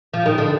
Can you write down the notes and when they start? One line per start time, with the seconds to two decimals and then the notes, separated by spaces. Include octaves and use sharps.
0.14 F3
0.26 D#3
0.38 D3